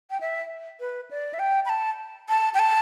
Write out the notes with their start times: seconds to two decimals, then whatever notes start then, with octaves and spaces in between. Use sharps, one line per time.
0.10 G5
0.20 E5
0.80 B4
1.11 D5
1.34 E5
1.39 G5
1.65 B5
1.69 A5
2.29 A5
2.54 G5
2.59 A5